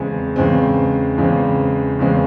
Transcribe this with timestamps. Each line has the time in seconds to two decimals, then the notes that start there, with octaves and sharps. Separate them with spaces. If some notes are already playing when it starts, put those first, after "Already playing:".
Already playing: E2 C#3 G#3 C4
0.36 E2 C#3 G#3 C4
1.18 E2 C#3 G#3 C4
1.99 E2 C#3 G#3 C4